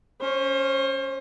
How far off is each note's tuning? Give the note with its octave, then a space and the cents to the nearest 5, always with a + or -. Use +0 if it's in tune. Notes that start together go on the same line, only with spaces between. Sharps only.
C#4 +0 C5 +35